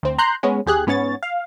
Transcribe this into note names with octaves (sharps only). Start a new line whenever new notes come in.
D2 C4
A#5 C6 F#6 G6
G#3 B3 C#4
D#2 G4 G#4 F#6
G#2 B3 C#4 C#5 A6
F5